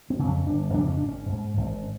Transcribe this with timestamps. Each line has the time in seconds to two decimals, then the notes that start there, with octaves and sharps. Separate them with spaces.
0.10 C4
0.19 F2 C#3
0.28 C#4
0.47 G1 D4
0.74 F2 C#3 D4
0.88 C#4
0.97 G#1 D4
1.09 C#4
1.29 G#2
1.57 G#1